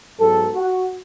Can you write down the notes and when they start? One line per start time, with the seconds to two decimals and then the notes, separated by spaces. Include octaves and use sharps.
0.19 G#2 F#3 B3 A4
0.55 F#4